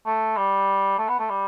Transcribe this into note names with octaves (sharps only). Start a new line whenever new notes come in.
A3
G3
A3
B3
A3
G3